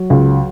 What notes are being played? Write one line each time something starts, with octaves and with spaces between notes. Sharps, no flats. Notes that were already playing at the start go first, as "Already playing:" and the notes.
Already playing: F#3
C#2